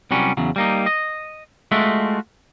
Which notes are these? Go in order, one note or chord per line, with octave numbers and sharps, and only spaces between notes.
C2 F#3 G3 C#4
E2 C#3 F#3
G3 A#3 D#4
D#5
G#3 A3 F4 F#4 E5